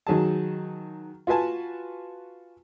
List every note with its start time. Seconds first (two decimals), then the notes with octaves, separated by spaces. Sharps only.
0.07 D#3 F#3 G#4 A5
1.27 F4 F#4 B4 G#5 A5